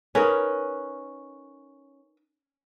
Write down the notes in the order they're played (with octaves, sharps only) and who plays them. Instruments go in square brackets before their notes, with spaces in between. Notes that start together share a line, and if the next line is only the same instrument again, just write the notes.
[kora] C#4 [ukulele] D#4 A#4 B4